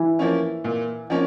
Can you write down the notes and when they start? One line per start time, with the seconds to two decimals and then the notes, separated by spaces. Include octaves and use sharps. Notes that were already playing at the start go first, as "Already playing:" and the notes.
Already playing: E3
0.19 F3 A#3 C#4
0.64 A#2
1.10 F3 A#3 C#4